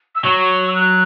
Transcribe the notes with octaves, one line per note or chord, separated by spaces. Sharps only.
E6
F#3 C#6
E6
F#6